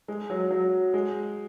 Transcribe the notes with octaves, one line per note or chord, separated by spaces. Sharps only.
G#3
F#3
F#3
G#3